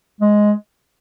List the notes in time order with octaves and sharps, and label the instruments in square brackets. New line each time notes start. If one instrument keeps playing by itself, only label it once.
[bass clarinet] G#3